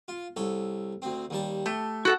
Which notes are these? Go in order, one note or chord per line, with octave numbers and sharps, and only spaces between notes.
F4
C2 A4 C#5
D2 C4
D#2 G3 A5
A3 G4
F#4 A4 F#5